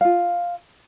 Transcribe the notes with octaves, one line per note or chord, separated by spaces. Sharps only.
F4 F5